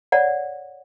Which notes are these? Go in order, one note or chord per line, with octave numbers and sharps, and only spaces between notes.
C#5 D5 F#5